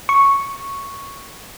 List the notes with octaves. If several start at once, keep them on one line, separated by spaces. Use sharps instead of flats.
C#6